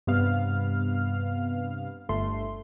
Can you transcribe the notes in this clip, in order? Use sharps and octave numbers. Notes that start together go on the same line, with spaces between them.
G2 C3 B3 F5 F6
G1 A3 C6